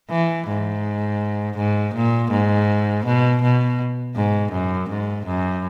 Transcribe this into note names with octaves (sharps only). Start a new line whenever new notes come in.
E3
G#2
G#2
A#2
G#2
B2
B2
G#2
F#2
G#2
F#2